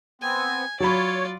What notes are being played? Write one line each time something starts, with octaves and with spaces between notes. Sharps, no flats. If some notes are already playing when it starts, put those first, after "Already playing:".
B3 C4 G#5
F#3 F4 C#5 D5 B5